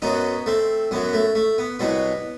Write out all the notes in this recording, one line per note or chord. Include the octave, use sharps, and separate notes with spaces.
F#2 F#3 B3 D#4
A3 C4
F#2 F#3 B3
A3
A3
B3
C2 B2 F#3 B3